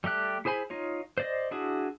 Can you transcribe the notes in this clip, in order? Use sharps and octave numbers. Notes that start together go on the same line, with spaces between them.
G3 A3 G4 F#6
E4 G#4 C5 G#5 B5
D#4 F4 C#5
C5 D5 D#5
D4 E4 F#4 G#4